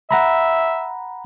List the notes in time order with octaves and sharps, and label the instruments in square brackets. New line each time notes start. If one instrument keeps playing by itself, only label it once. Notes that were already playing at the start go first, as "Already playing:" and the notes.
[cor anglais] E5 [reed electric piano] F#5 A#5 B5